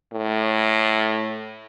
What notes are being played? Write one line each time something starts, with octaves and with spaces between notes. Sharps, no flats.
A2